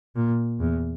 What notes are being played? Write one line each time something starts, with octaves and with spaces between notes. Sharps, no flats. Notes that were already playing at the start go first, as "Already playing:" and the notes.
A#2
E2